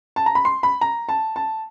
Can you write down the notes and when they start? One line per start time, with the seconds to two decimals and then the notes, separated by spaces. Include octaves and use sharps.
0.16 A5
0.26 A#5
0.35 B5
0.45 C6
0.63 B5
0.81 A#5
1.09 A5
1.36 A5